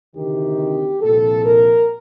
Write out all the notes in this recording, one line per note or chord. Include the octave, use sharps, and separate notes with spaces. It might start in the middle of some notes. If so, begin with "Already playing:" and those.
D2 C3 D#3 G4
C2 A#2 F3 A4
A#4